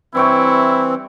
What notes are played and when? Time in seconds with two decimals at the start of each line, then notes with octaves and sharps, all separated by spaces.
0.15 G2 E3 C4 E4 C#5 G5